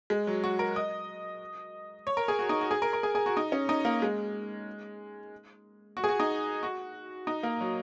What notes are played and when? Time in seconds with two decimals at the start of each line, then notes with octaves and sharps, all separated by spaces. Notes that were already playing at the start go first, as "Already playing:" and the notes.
0.10 G#3
0.27 F#3
0.44 F#4
0.59 A#4
0.76 D#5
2.07 C#5
2.17 A#4
2.28 G#4
2.39 F#4
2.49 D#4
2.61 F#4
2.71 G#4
2.82 A#4
2.93 A#4
3.03 G#4
3.15 G#4
3.26 F#4
3.37 D#4
3.52 C#4
3.69 D#4
3.85 A#3
4.02 G#3
5.97 F#4
6.04 G#4
6.09 F#4
6.20 D#4
6.63 F#4
7.27 D#4
7.43 A#3
7.61 F#3